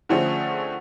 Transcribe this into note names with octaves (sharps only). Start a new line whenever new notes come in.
D3 F3 A3 C4 C#4 G#4